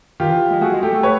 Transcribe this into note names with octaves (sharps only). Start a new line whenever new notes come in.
D#3 F4 G4
E3
G#3
A3 F#4 G#4
G#3
A3 G4 A4
A3
B4 C#5